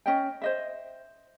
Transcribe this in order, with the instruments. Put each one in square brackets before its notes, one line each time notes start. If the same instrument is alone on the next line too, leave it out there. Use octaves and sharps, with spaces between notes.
[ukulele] C#4 D#5 G5
C5 D#5 E5